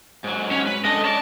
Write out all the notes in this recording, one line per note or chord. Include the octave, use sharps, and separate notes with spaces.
G#2 F#3
C#4
B4
G#3 D4 A4 D#5
C#4 D5 A5